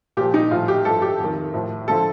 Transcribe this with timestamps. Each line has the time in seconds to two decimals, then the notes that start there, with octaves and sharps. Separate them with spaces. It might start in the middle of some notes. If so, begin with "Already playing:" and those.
0.17 A#2 F3 G4
0.34 D#4
0.51 A2 F3 F4
0.68 G4
0.85 G2 F3 A4
1.02 G4
1.20 F2 D#3
1.54 A2 F3
1.88 D3 F3 A4